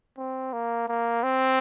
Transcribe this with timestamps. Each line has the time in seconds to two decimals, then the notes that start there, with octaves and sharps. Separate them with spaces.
0.18 C4
0.53 A#3
0.88 A#3
1.23 C4